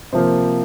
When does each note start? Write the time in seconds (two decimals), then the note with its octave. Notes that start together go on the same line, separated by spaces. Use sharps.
0.13 C3 F3 A#3 C5